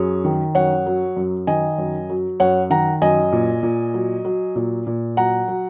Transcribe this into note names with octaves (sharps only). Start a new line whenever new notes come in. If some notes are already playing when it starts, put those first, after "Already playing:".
Already playing: F#2 G#4 C#5
D#3
F#2 C#5 F#5
F#3
F#2
D#3 D#5 G#5
F#2
F#3
F#2 C#5 F#5
D#3 F#5 A#5
F#2 D#5 G#5
A#2
A#2
F#3
F#3
A#2
A#2
F#3 F#5 A#5
F#3